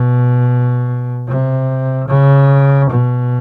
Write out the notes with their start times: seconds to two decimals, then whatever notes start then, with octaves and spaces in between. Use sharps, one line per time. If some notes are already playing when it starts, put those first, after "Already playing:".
Already playing: B2
1.28 C3
2.08 C#3
2.90 B2